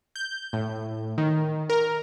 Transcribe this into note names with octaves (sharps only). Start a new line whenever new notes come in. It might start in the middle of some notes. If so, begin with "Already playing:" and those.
G6
A2
D#3
A#4